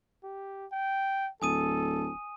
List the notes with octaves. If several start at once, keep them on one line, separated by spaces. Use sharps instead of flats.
G4
G5
D1 A4 G#5 D#6 D#7